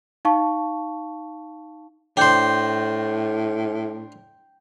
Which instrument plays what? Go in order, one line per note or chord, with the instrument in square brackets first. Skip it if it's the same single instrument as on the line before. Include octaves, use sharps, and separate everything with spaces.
[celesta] D#4 F5 A5 C#6
[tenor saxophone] A2 [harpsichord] D4 C5 [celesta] G5 G6